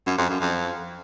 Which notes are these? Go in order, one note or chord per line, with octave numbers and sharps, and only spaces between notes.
F#2
F2
F#2
F2